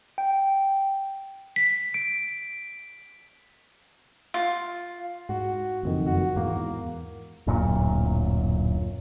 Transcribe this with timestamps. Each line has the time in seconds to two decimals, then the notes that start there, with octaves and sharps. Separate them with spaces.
0.18 G5
1.56 B6
1.94 D7
4.34 F4
5.29 G#2 F#4
5.83 F#1 F2 D#3
6.07 F#2 F#4
6.36 E2 G#2 A#3
7.47 D1 F#2 A#2